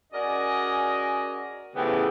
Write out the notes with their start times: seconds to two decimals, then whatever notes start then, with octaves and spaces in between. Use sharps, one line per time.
0.13 C#4 F#4 G#4 A#4 D5 D#5
1.75 A2 C#3 E3 F3 B3 G4